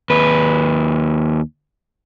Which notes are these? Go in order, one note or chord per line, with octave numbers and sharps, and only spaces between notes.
D#2 B4